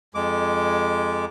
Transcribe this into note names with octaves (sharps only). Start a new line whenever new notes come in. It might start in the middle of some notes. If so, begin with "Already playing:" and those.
F2 G#3 D6